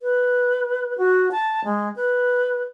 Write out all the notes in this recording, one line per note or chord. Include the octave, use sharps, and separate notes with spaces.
B4
F#4
A5
G#3
B4